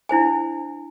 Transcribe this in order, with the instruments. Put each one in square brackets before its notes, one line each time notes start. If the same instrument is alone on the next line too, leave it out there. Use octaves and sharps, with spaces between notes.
[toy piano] D4 E4 C5 G#5